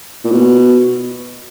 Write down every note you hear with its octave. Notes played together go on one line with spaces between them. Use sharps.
A#2
B2